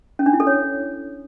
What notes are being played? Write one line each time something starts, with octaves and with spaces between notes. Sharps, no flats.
C#4
D4
E4
A4
C#5